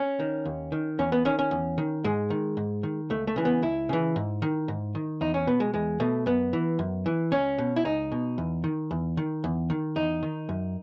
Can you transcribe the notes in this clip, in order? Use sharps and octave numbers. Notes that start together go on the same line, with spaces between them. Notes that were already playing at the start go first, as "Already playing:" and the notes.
Already playing: C#4
D#3
D#2
D#3
E2 C#4
B3
D#3 C#4
C#4
E2
D#3
G#2 G#3
D#3
G#2
D#3
C#2 A3
A3
C#3 E3
B3
C#2 E4
C#3 E3
G#2
D#3
G#2
D#3
E2 D#4
C#4
B2 B3
G#3
E2 G#3
B2 A3
F#2 B3
E3
F#2
E3
C#2 C#4
B2
E4
C#2 D#4
B2
E2
D#3
E2
D#3
E2
D#3
E2 D#4
D#3
F#2